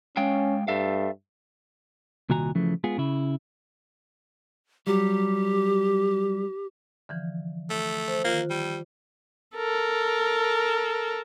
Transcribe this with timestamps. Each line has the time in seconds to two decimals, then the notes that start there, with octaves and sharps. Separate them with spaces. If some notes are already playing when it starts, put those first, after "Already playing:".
0.17 G#3 C#4 F5 G5
0.68 G2 A4 E5 F5
2.30 C2 A#2 D#3 F#4 G#5 A#5
2.55 C#3 E3 F3 A3
2.84 G#3 B3 F4 G#4
2.98 C#3 E4
4.87 F#3 G3 G4
7.09 D3 E3 F3
7.70 A3
8.08 C5
8.24 D#3 A#3 F4
8.50 G3
9.56 A4 A#4